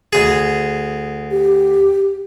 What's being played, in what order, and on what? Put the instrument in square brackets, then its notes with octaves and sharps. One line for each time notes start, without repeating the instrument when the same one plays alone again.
[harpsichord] D2 G#4
[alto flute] G4